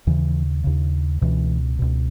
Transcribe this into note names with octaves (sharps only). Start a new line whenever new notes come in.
D#2 C#3 E3
D#2 C#3
C#2 B2 E3
C#2 B2